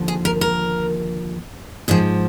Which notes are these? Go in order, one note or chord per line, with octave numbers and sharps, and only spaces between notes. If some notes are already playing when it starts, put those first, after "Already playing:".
Already playing: D#2 D3 F3
G#4
A#4
A#4
G#2 F3 G#4